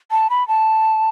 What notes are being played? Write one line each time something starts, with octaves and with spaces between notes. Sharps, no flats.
A5
B5
A5